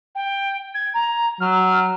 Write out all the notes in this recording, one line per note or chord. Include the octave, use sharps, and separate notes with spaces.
G5
G#6
A#5
F#3 F6